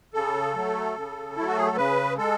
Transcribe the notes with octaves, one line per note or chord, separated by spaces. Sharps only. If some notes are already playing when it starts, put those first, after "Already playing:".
C#3 A4
F#3 A3
C#3
F#3 A3 E4
F#4
G#4
A4
C#3 B4
G#3 A4